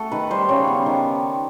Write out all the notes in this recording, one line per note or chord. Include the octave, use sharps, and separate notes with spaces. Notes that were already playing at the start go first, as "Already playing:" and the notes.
Already playing: A3 F#4 A4
D#3 B4
G3 C5
C#3 C#5
B3
D#3